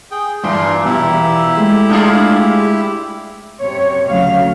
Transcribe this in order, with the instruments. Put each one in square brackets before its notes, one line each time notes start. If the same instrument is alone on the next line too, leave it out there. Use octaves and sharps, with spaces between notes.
[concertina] G#4 G5
[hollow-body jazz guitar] G2 [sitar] A#2 E3 [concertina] D4 C6
[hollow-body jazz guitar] E2 B2 [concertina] E4 G4 E5
[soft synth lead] E6
[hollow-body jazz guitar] G#3 [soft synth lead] A3
[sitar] D4 F4 G#4
[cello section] F#2 C3 C#5
D2 C#3 F#3 F5